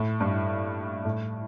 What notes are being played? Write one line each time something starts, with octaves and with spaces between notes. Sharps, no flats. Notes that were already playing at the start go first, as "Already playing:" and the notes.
Already playing: A2
G2
A2